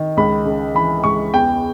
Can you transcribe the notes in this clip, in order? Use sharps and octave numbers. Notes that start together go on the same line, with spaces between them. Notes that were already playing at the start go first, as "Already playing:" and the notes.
Already playing: D#3
C#2 B5
C#3
E3 B5
C#2 C#6
E2 G5